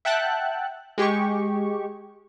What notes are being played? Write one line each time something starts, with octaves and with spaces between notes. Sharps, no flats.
E5 F#5 G5 A5 F#6
G#3 G4 G#4 C#6